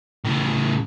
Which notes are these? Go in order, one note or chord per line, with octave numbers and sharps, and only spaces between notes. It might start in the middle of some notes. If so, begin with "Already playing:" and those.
A2 C#3